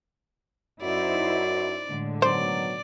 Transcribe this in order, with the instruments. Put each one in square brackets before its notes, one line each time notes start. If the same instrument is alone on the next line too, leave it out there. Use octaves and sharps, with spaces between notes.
[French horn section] F#2 F#4 [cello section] D#4 E4 C5 [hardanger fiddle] D5
[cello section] A2 D3 G#3
[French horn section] B2 D#3 F#3 [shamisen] C5 [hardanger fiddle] D5